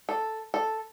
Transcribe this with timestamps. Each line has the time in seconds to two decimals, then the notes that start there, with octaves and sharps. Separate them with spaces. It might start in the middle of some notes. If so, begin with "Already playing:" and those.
0.09 A4
0.54 A4